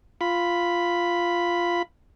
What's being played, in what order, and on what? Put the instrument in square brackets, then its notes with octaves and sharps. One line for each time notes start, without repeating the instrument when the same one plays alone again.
[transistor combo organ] F4 B5